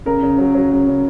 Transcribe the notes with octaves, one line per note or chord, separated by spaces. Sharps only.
C#3 A#4
C#3
F#3
F#3
C#3
C#3